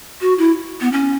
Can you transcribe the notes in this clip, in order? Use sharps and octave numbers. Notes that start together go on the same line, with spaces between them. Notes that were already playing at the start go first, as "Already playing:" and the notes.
F#4
E4
B3
C#4